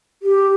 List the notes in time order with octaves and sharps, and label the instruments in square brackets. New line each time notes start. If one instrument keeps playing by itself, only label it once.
[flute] G4